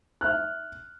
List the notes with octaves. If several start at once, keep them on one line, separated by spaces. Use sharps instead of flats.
E5 F6 F#6